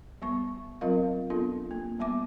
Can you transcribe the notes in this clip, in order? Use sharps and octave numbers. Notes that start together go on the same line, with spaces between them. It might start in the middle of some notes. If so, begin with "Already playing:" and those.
G3 B3 C#6
F#3 C4 F4 A#4 D#5 F5
B3 D4 F4 A4
A#3
G3 B3 E5 D6